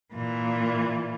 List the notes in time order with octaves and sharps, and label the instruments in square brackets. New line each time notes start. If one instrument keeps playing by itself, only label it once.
[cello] A#2 E3